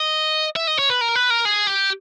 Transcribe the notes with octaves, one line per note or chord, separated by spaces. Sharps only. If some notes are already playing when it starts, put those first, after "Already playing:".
Already playing: D#5
E5
D#5
C#5
B4
A#4
B4
A#4
G#4
G4